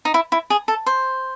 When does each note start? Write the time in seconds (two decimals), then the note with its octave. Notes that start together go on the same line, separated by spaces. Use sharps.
0.05 D#4
0.14 E4
0.32 E4
0.50 G#4
0.68 A4
0.86 C5